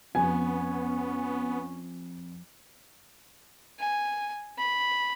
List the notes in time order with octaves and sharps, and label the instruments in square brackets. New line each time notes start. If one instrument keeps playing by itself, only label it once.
[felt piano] F2 [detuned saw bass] B3 [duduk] C#4 [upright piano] G#5
[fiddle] G#5
B5